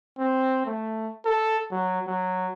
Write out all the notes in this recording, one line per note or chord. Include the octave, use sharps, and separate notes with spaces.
C4
A3
A4
F#3
F#3